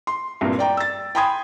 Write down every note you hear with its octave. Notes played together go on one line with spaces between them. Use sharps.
C6
C2 G2 A#2
D5 G5 A#5
E6 A6
G5 G#5 B5 C6 D#6 G#6